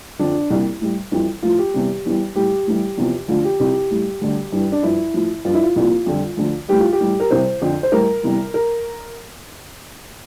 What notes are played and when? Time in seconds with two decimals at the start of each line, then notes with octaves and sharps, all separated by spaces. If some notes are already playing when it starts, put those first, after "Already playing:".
0.19 F2 D3 F3 D4
0.50 C2 A#2 G3
0.81 A2 G3
1.12 F2 E3 G3
1.43 A2 F3 F4
1.58 G4
1.74 E2 C3 G3
2.05 E2 E3 G3
2.36 A2 G3 G4
2.67 A2 E3 G3
2.97 E2 C3 F3
3.28 D2 D3 F3 F4
3.44 G4
3.59 C2 C3 F3 G4
3.91 A2 G3
4.21 D2 D3 G3
4.52 G2 E3 G3
4.72 D4
4.83 G2 F3 E4
5.14 A2 F3
5.45 G2 F3 F4
5.54 E4
5.63 F4
5.76 C2 A#2 F3
6.06 F2 D3 G3
6.37 D2 D3 F3
6.68 A2 E3 G3 G4
6.80 F4
6.92 G4
7.00 A2 E3 G3
7.20 A#4
7.30 C2 C3 E3 G3 C5
7.61 F2 D3 F3
7.83 C5
7.92 A2 E3 G3 A#4
8.23 E2 C3 E3 G3
8.54 A#4